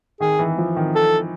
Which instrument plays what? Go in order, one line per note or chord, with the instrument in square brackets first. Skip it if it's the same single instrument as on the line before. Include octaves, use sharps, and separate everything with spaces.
[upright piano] D#3 [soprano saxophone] G#4
[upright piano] E3
F3
D#3
[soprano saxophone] A4